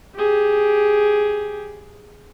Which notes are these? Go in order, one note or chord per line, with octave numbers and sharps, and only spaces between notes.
G4 G#4